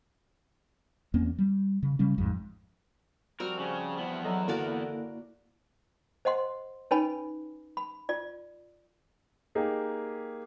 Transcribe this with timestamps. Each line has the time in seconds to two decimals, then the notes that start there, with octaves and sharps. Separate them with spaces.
1.14 E2 A#3 C4 C#4
1.39 G3
1.83 C#3
1.99 C#3 G3 C#4
2.18 A1 F2 G#2
3.40 F3 G3 C4 F#4 A#4
3.59 C#3 C#4
3.97 E2 B3
4.24 F#3 A4 D#5
4.48 D3 A#3 E4 F#4 A#4 D5
6.25 C5 D#5 F#5 C6
6.91 C#4 D#4 B4 C#5 G#5 B5
7.77 B5
8.09 F4 D5
9.55 A#3 D#4 G4 G#4